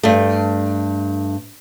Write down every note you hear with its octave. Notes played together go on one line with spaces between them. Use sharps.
G2 A3